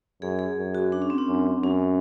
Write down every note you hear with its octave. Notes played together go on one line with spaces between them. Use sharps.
F#2 G#4
G#4
F#2
F#4
D4
C#4
C4
D4
F#2
F#2 C#4